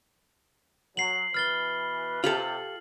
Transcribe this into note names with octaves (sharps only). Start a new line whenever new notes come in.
F#3 C7 F#7
B2 E3 B4 F6 A6 G7
C3 F4 G4 A4 F#7